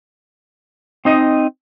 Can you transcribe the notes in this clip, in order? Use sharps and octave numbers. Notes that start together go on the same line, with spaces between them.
C4 D#4 D#5